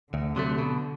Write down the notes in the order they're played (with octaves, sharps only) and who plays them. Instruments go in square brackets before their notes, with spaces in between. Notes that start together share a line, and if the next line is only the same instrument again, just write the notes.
[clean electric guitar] D2 [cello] D3
[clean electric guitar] C3 F#3 A3
B2